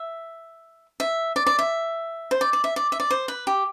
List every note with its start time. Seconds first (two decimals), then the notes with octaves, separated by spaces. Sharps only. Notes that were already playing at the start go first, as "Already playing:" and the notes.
Already playing: E5
1.00 E5
1.36 D5
1.47 D5
1.59 E5
2.31 C5
2.41 D5
2.53 D5
2.64 E5
2.76 D5
2.92 E5
3.00 D5
3.11 C5
3.28 B4
3.47 G4